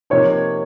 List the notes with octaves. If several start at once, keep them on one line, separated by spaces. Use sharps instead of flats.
C3 F3 A#3 D#4 C#5